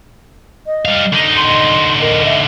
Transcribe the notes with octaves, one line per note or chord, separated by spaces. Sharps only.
D#5
G3 F5
D3 D#4
C6
A#4
E5